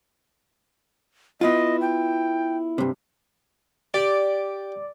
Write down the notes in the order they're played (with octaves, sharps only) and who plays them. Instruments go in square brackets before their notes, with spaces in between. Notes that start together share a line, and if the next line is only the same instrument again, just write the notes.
[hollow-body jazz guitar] B3 E4 F4 [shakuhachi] D#5
[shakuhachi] G5
[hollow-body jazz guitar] G2 C3
[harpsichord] G4 [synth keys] D5